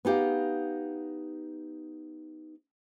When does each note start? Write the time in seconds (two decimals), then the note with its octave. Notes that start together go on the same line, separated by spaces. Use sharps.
0.05 B3 D#4 G4 F5